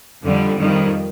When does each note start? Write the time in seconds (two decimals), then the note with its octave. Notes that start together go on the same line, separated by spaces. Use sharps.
0.24 F2 D3 G3
0.58 F2 D#3 G3